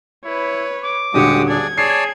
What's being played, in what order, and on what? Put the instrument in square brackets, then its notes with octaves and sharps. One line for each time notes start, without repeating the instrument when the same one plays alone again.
[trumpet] E4 [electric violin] B4 C#5
[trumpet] D6
[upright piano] D#1 D3 [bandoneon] G#3 G4 D#6 [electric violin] F#4 C#7
[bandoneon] D4 G#4 D5 [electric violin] G#6
[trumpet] G#4 [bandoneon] C#5 D5 A5 [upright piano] C7